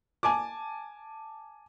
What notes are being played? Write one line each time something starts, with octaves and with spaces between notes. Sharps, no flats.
G#5 A5 D6